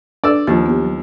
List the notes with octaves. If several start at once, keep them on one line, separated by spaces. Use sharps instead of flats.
D4 A4 B4 D5 E6
D#2 F3 A6
B3 G4
F#3